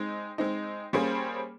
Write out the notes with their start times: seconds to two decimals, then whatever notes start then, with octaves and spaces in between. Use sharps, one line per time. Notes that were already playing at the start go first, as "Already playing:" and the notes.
Already playing: G#3 C4 D#4
0.38 G#3 C4 D#4
0.93 G3 A#3 C#4 G#4 C5